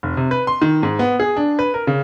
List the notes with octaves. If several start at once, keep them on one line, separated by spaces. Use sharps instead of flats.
F1
C3
B4
C6
D#3
G#2
B3
G#4
D4
B4
A#4
C#3